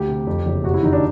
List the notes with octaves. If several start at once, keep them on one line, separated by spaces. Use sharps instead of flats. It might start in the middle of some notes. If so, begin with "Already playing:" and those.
Already playing: D2 G4
C3
F2
F#1
C3 F#4
E4
D#3 D#4
D4